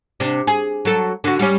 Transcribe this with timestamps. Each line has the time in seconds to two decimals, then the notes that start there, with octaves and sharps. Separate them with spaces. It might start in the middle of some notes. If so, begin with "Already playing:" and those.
0.20 C3 D4
0.47 G#4
0.85 F#3 A4
1.24 D3 F#4
1.39 G3 C#4